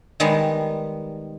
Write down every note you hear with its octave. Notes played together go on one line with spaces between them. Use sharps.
D#3 G3 G#3 B3